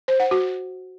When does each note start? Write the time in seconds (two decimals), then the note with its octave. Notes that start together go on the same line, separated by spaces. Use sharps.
0.08 C5
0.20 F#5
0.31 F#4